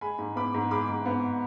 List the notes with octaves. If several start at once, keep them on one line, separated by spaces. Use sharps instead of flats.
G#3 G#5 B5
G#2
B3 B5 D6
G#2
G#3 B5 D6
G#2
B3